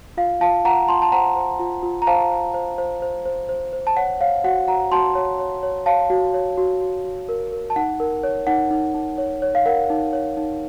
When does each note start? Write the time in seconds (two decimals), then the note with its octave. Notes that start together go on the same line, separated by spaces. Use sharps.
0.17 F4 F5
0.41 F4 F5 A5
0.65 F4 F#5 A#5
0.89 F4 A5 C6
1.02 A5
1.12 C5 F#5 A#5
1.36 C5
1.60 F4
1.83 F4
2.02 A#5
2.07 C5 F5 A5
2.31 C5
2.54 C5
2.78 C5
3.02 C5
3.25 C5
3.49 C5
3.73 C5
3.87 A5
3.97 C#5 F#5
4.21 C#5 F5
4.44 F#4 F#5
4.67 F#4 F#5 A#5
4.92 F#4 A5 C6
5.15 C#5
5.39 C#5
5.63 C#5
5.86 C#5 F5 A5
6.10 F#4
6.34 C#5
6.57 F#4
6.82 F#4
7.05 F#4
7.29 A#4
7.52 A#4
7.70 A5
7.76 D#4 F#5
8.00 A#4
8.23 C#5
8.47 D#4 F#5
8.71 D#4
8.94 D#4
9.18 C#5
9.42 C#5
9.55 F5
9.66 A#4 F#5
9.90 D#4
10.13 C#5
10.37 D#4